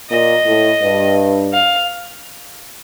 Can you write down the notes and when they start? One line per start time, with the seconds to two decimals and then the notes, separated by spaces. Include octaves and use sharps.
0.10 A#2 D#5
0.45 A2
0.81 G2
1.53 F5